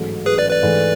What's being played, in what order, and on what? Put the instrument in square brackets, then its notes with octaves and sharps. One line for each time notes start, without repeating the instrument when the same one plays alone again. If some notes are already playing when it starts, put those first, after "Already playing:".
Already playing: [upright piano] A1 G#2 F#3 A3
[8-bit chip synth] G#4 B4
B4 D5
B4 D5
[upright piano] G#2 E3 A3